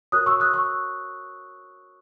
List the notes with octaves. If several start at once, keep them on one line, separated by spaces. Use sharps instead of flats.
F#4 A#4 C#5 D#6 F#6
C#6 E6
D#6 F#6
C#6 E6